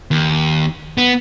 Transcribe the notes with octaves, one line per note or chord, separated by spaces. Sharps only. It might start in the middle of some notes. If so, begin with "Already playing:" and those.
D#2
B3